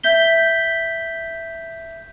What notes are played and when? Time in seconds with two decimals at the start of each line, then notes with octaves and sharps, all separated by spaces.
0.03 E5 G6 B6 G7